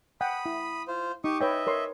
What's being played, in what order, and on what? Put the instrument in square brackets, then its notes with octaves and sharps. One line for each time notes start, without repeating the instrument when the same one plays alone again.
[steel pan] F#5 G5 [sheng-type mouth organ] B5 D#6
[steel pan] E4
[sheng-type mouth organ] F4 C5
[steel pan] D#4 [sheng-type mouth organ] G4 C#6 D#6
[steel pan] B4 C#5 G5 [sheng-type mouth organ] D#5 E5
[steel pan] A#4 C#5 C6